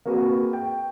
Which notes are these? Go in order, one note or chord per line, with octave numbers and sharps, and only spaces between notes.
A#3 C4 F#4 G#4 B4
G5